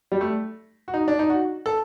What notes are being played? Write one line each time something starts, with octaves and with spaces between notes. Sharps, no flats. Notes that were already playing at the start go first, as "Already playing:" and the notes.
G3
A3
F#4
D#4
D4
D#4
F#4
A4